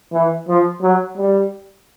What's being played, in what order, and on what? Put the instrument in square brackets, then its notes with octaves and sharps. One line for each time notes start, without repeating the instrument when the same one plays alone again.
[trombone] E3
F3
F#3
G3